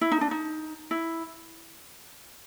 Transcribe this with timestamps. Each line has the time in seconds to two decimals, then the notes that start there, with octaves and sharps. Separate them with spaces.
0.01 E4
0.12 D#4
0.21 D4
0.31 D#4
0.91 E4